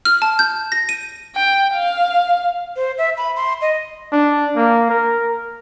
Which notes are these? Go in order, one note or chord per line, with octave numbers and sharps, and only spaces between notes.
F6
A5
G6
A#6
D#7
G5
F5
C5
E5
B5
C6
D#5
D4
A#3
A#4